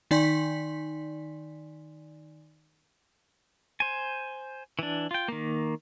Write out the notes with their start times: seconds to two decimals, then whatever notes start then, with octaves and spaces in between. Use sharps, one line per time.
0.11 D#3 D#4 D5 G#5 C6 B6
3.80 C5 G#5
4.79 E3 D4
5.11 F4 G5
5.28 D#3 A#3